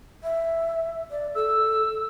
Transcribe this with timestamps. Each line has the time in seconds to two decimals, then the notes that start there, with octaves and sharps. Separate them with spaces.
0.23 E5
1.10 D5
1.35 A4 E6